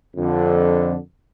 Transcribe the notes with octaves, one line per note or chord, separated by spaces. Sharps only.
F2 D3